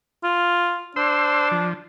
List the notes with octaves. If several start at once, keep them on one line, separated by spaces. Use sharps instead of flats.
F4
D4 C5 C6 E6
F3